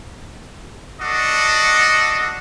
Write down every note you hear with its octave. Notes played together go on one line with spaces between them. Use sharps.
D4 F#4 A4 D#5